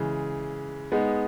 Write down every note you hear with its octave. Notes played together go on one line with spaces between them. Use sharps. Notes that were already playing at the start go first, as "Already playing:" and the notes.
Already playing: C#3 E3 G#3
G#3 B3 D#4